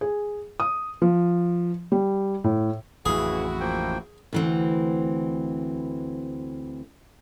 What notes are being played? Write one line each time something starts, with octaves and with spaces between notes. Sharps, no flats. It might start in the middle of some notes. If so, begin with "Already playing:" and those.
G#4
D#6
F3
G3
A2
A1 F2 C#3 E3 E4 F#4 G#4
F3 A#3 G5
D2 E3 C4